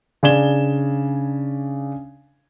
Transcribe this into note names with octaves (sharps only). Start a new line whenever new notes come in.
C#3 D4 D5 G#6 E7 G7